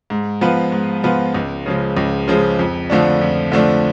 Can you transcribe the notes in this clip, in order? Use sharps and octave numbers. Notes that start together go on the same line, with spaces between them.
G#2
F3 B3 F4 B4
G#2
F3 B3 F4 B4
C#2
C#3 F3 G#3
C#2
C#3 F3 G#3
F2
D3 F3 A3 D4
F2
D3 F3 A3 D4